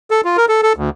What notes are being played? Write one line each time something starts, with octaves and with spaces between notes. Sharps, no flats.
A4
F4
A#4
A4
A4
D2